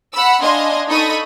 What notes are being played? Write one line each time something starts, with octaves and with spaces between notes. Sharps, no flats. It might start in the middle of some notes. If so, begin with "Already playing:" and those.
F#5 B5 E6
D4 D#5 F5 G#5 C6
D#4 A4 D#5 B5 C#6 D#6